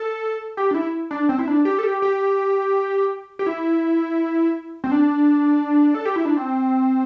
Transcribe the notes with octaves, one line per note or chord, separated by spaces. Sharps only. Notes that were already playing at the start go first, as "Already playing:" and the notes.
Already playing: A4
G4
D4
E4
D4
C4
E4
D4
G4
A4
G4
G4
G4
E4
C4
D4
A4
G4
E4
D4
C4